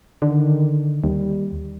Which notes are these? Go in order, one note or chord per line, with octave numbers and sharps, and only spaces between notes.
D3 D#3
D#2 G3